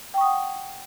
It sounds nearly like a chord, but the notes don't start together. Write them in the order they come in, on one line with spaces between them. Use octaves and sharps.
G5 C#6 D#6 F#5